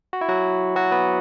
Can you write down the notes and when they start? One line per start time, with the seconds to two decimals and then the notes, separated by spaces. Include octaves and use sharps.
0.13 F#4
0.21 E4
0.29 F#3 F#4
0.76 F#3 F#4
0.92 B3 B4